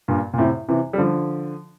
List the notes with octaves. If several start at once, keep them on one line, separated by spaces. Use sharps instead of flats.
G2 A#2
A#2
A2 C3
C3 E3
G3
D3 F3